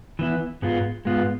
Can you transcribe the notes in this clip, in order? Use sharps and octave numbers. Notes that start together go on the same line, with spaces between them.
E3 B3 E4
G#2 G#3 B3 F4
G#2 G#3 B3 F4